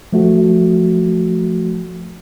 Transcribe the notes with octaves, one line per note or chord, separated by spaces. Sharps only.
F3 A3 F#4